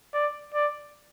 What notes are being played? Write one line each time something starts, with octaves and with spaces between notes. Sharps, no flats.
D5
D5